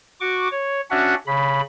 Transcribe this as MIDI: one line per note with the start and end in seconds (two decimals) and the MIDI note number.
0.20 0.48 66
0.20 0.48 85
0.20 0.48 86
0.51 0.81 73
0.90 1.15 61
0.90 1.15 62
0.90 1.15 66
0.90 1.15 76
0.90 1.15 78
1.27 1.61 49
1.27 1.61 83